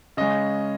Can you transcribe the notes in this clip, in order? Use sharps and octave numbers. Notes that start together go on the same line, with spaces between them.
C#3 G#3 C#4 D#5